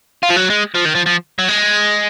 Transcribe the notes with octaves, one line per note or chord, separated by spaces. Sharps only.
F4
F3
F#3
G#3
F3
D#3
F3
F3
F#3
G#3